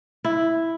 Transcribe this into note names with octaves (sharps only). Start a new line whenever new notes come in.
E4